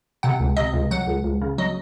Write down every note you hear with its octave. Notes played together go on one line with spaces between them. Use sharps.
C3 F#5
C#2
C3 D#5
C#2
F#3 F#5
C#2
C#2
C#3
F#3 D#5